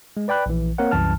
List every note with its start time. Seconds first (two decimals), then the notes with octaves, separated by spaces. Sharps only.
0.17 G#3
0.28 B4 D5 G5 B5 F#6
0.46 A#1 E3
0.78 A#3 C4 A#4 C#5 F#5
0.91 C2 F#2 E3 A5 F6